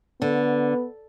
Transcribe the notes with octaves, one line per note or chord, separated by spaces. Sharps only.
D3 B3